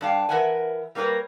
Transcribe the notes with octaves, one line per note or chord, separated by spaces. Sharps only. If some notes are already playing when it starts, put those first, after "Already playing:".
G2 D4 F5 G5
E3 A#4 B4 E5 F#5 G#5
G3 A#3 D4 A#4 B4 C#5